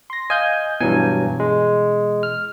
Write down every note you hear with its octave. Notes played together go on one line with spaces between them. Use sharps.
C6 A#6
D#5 F5 G#5 G6
G2 B2 E3 F#3 G#5
G#3
F6